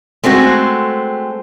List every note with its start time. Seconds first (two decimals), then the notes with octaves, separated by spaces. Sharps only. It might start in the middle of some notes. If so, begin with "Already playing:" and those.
0.24 G#3 A3 C4 F#4